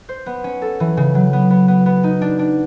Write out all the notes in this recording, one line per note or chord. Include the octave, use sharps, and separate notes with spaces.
C5
B3
C#4
A4
E3
C#3
F#3
B3
B3
B3
B3
D#4
D4
D4